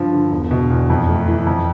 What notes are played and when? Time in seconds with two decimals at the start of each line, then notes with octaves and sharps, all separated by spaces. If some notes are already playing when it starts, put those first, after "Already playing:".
Already playing: G2 F3
0.13 D3
0.32 E1
0.51 B2
0.70 E2
0.90 F2
1.09 A3
1.28 E3
1.47 F2